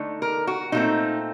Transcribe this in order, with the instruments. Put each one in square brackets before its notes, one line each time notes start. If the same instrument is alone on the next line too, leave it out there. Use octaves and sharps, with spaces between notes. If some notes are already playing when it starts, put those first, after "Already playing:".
Already playing: [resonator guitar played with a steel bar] D3 A3 D#4
A#4
F#4
A#2 A3 C4 D#4